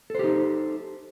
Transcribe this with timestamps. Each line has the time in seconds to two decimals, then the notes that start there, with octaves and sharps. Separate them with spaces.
0.10 A4
0.15 C5
0.19 G4
0.24 D#4